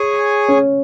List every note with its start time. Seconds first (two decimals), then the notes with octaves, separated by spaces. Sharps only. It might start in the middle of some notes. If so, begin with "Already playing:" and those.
Already playing: G#4 C#5 G#5
0.48 C#4